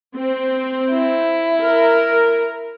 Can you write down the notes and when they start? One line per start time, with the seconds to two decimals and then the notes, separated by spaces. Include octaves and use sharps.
0.16 C4
0.91 E4
1.63 A#4